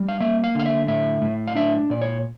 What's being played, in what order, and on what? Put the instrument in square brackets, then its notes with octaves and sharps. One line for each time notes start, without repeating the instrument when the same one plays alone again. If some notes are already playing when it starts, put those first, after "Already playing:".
Already playing: [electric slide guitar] G3
F5
A#3 E5
F5
D3 F5
E5
A2 E5
A2
F5
D4 E5
A#2 D5
C#5